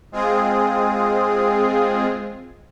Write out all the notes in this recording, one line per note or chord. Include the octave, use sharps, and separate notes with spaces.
G#3 C4 F4 G#4